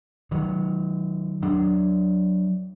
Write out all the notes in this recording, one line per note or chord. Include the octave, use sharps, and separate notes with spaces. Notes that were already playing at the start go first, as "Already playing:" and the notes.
D#3 F#3
F#3 D4